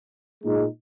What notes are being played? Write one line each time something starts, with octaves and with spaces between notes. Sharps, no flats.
A#2 G#3 D#4